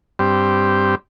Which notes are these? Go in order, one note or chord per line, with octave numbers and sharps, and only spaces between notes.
G2 C4 G4